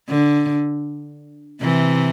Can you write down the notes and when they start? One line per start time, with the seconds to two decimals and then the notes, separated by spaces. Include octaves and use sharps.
0.09 D3
1.62 C3 E3